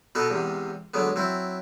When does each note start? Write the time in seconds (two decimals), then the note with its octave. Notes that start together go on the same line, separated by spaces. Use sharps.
0.15 B2 B3 D#4 F#4 A4
0.30 E2 G#2 C3
0.94 D3 F#3 G#3 B3
1.16 F#3 C4 E4